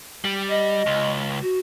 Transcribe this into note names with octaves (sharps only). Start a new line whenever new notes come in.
G3
D#5
C#2
F#4